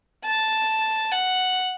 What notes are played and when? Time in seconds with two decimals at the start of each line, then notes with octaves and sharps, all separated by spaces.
0.25 A5
1.12 F#5